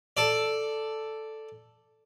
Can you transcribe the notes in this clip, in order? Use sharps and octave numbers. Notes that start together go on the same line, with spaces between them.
A4 D5